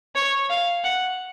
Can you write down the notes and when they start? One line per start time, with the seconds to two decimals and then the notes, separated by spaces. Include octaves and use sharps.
0.16 C#5
0.50 F5
0.84 F#5